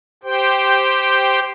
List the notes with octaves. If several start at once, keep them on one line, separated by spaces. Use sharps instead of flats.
G4 C5 G5